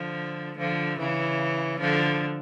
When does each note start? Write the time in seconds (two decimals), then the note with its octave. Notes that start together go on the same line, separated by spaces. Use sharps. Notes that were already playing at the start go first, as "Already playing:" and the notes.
Already playing: D3 F3
0.57 D3 F3
0.99 C#3 E3
1.80 D3 F3